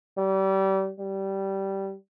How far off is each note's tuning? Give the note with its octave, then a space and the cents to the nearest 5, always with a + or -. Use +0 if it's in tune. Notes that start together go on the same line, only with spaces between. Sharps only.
G3 -30
G3 -15